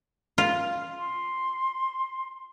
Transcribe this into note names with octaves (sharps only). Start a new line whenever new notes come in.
F4
C6